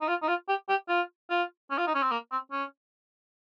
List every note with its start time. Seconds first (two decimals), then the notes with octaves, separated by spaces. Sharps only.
0.01 D#4
0.08 F4
0.22 D#4
0.28 F4
0.49 G4
0.69 G4
0.89 F4
1.30 F4
1.70 C#4
1.78 F4
1.87 D#4
1.95 C#4
2.03 C4
2.11 A#3
2.31 C4
2.52 C#4